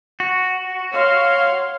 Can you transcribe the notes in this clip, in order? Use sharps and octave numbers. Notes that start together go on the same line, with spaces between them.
F#4
C#5 F5 C6